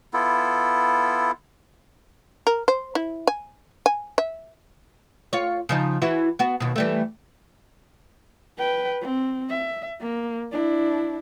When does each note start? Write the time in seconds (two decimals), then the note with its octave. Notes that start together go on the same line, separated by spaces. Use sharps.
0.13 B3 E4 F4 A4
2.47 A#4
2.68 C5
2.95 E4
3.27 G#5
3.86 G#5
4.18 E5
5.33 F4 C#5
5.69 C#3 F3 D#4
6.02 E3 E4 F#4
6.39 B3 F#4
6.60 D#2 B2
6.76 E3 G3 A3
8.58 B4 G5
9.01 C4
9.49 E5
10.00 A#3
10.52 D4 E4